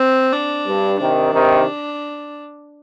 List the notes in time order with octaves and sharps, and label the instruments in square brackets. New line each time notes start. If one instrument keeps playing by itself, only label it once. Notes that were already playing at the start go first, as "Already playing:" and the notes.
Already playing: [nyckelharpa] C4
D4
[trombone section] G2
[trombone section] C3 D#3 [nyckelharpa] D4
[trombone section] C3 D#3